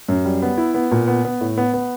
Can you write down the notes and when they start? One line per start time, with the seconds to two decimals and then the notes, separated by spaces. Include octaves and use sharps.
0.08 F#2
0.25 G3
0.42 B3
0.57 E4
0.74 B3
0.91 A#2
1.08 B3
1.25 B3
1.41 A2
1.58 B3
1.74 B3